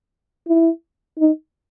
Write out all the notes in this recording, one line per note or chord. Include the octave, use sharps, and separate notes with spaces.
E4
D#4